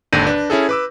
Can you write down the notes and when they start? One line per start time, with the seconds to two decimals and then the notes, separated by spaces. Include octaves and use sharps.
0.13 G#1 D#2 D3 G6 A#6 D#7
0.27 D4 B4
0.50 C#4 E4 G#4 A4
0.69 B4 D6 E6